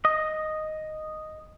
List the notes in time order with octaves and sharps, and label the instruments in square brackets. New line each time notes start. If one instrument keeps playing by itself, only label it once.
[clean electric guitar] D#5